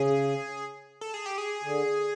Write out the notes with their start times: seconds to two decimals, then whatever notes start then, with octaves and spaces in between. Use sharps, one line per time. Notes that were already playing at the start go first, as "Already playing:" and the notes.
Already playing: C#3 G#4
1.01 A4
1.14 G#4
1.26 G4
1.38 G#4
1.63 D3